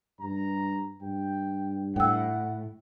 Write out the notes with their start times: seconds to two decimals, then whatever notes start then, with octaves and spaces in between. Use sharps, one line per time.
0.20 G2 A#5
1.02 G2 G5
1.96 A2 F#5 G5 E6